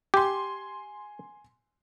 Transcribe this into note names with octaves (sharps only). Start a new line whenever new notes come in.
G4 G#5 C6